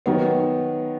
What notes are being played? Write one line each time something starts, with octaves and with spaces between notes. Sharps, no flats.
D#3 F#3 B3